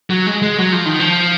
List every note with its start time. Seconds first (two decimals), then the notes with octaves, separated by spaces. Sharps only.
0.10 F#3
0.27 G#3
0.42 G#3
0.58 F#3
0.72 F3
0.86 D#3
1.00 F3